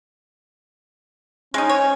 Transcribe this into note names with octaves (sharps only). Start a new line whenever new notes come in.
G#3 C#4 D#4
C#5